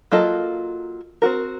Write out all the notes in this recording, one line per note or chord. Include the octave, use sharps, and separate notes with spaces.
F#3 A#3 F4 A4 D#5
C4 F#4 A#4